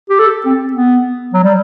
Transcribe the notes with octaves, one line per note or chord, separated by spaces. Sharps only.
G4
A4
C4
B3
F#3
G3